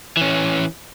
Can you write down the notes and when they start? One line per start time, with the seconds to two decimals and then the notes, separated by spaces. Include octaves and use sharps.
0.17 E3 C#4